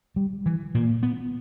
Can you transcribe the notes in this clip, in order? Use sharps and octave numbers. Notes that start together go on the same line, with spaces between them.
G3
E3
A#2 A#3
B3